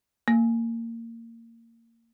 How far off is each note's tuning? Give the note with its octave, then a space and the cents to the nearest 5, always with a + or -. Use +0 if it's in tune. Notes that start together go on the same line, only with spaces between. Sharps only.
A#3 -20